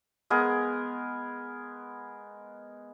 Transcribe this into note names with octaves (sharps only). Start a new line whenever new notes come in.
G#3 B3 G#4 A#4